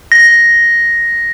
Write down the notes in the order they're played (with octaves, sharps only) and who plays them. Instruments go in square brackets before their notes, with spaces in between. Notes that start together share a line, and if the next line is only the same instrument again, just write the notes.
[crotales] A#6